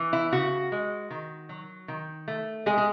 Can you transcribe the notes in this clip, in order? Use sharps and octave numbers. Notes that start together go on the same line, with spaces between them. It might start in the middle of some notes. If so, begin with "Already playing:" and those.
Already playing: E3
E4
C#3 F#4
G#3
D#3
F#3
D#3
A3
G#3 G#4
G#4